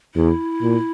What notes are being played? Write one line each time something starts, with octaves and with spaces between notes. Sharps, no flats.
E2 E4
A#2